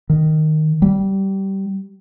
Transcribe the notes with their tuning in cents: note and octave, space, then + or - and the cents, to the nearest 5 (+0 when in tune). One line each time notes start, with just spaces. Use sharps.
D#3 -5
G3 -20